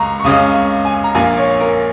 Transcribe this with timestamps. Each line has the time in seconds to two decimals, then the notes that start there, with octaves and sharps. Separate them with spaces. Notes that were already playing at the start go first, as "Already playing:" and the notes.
Already playing: C#2 G#3 A#5 C#6
0.20 C#6
0.24 C#2 C#3 G#3 C#4 D#6
0.54 C#6
0.85 G#5
1.04 A#5
1.15 A#1 A#2 A#3 G#5
1.38 C#5
1.61 A#4